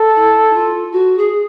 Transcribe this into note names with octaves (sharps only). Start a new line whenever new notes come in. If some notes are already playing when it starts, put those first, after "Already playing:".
Already playing: A4
E4
F4
F#4
G#4